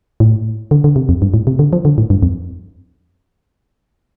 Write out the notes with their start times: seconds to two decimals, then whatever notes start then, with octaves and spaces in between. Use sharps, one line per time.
0.20 A2
0.71 D3
0.84 D3
0.96 C3
1.09 F2
1.22 G2
1.34 A2
1.47 C3
1.59 D3
1.73 F3
1.85 D3
1.98 A2
2.10 G2
2.23 F2